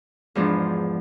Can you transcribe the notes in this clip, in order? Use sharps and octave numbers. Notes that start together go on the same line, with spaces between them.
E2 G#2 F3 D4